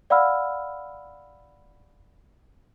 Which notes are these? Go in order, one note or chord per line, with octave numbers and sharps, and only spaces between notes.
D5 F5 F#5 B5 E6 F6